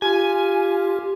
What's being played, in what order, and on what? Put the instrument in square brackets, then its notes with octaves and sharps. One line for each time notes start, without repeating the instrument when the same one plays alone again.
[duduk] F4 [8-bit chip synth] G4 [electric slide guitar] G#5